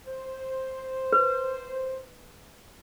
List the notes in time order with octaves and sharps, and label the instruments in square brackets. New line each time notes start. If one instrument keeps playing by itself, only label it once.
[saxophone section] C5
[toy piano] B4